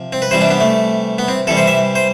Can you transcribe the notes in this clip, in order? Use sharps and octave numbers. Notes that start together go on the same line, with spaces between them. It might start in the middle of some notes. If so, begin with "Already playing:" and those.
Already playing: C3 F3
C4
B4
C3 E3 G3 C5
D4
B3
A3
B3
C4
C3 E3 G3 A4
C5
E5
C5